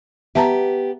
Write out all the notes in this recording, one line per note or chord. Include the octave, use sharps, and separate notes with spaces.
B3 G4 E5 A5 A#5